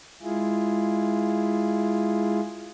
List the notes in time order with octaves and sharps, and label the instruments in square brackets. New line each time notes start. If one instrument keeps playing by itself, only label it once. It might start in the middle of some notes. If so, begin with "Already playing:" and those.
[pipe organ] G#3 E4 F4 G#4